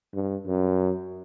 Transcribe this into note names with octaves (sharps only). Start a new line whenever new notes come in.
G2
F#2